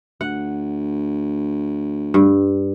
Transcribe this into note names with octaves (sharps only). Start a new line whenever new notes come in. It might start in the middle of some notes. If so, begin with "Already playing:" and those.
D2 F#5
G2